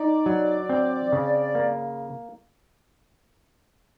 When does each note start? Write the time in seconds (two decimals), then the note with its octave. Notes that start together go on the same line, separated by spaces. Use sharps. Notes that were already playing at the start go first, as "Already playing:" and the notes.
Already playing: D#4 D5
0.26 F#3
0.69 C4
1.12 C#3
1.55 A#3